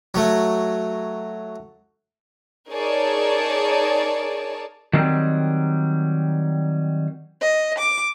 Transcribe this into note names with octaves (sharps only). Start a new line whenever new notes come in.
F#3 A3
D#4 G#4 A#4 C#5 D5 A5
D#3 F#3 G3 C4
D#5
D6